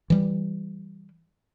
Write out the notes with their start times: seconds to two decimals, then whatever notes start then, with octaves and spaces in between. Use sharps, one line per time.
0.10 E3 G3